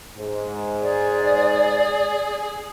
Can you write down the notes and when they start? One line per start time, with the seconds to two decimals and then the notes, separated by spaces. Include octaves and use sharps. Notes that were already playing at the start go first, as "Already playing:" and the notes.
0.16 G#2
0.82 G#4 D5